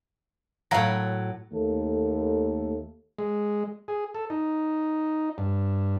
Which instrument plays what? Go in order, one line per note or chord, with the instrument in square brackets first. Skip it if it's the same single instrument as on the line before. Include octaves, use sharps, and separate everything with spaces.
[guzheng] A2 F#3 [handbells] F5 A#5 A#6
[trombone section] D#2 A3 A#3 A4
[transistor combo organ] G#3
G#4
A4
D#4
G2